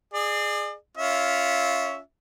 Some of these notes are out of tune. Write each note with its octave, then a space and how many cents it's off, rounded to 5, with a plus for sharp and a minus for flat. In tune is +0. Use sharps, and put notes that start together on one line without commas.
G#4 +0 D5 +35
C#4 +15 F4 +0 E5 -15